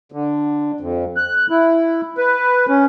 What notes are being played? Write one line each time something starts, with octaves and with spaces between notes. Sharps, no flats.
D3
F2
F#6
E4
B4
C#4